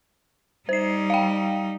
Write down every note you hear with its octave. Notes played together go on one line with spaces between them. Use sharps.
G3 D#4 C5 C7
F5 G5